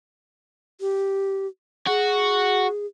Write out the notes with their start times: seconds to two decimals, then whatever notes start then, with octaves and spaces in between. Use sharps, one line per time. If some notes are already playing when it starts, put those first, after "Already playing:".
0.81 G4
1.87 F#4 G#4